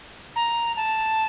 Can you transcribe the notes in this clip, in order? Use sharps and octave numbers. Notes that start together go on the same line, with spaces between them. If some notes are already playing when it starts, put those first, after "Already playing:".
A#5
A5